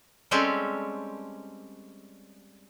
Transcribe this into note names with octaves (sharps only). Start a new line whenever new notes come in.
G3 G#3 C4 C#4 G4 A4